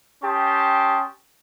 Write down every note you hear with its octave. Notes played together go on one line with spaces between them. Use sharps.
C#4 G4 G5 A5 C6 D#6